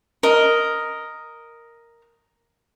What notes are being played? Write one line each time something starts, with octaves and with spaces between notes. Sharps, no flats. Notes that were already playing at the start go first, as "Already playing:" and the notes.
A#4 D#5